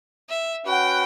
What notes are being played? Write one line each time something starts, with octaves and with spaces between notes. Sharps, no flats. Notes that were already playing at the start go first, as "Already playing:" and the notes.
E5
C#4 F#4 B4 F#5 G5